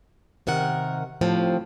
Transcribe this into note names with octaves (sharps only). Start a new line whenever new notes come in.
C3 D#3 A#4 F#5
A2 C3 F3 C4